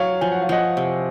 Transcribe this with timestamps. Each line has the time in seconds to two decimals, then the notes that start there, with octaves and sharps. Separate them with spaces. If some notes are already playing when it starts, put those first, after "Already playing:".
Already playing: F#3 C#5 F5
0.21 F3 G#5
0.32 F#5
0.42 F5
0.49 F3 D#5 F#5
0.77 C3